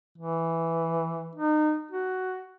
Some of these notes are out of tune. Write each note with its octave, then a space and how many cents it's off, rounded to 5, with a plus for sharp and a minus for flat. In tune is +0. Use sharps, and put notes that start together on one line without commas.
E3 +0
D#4 -30
F#4 +10